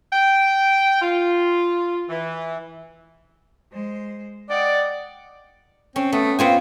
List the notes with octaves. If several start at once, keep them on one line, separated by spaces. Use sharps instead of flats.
G5
F4
E3
G#3 C5
D5 D#5 F#5 G5
C4 C#4
A3 B3
B3 C4 F4 G#5